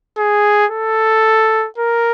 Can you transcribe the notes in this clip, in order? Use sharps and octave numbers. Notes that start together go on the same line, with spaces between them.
G#4
A4
A#4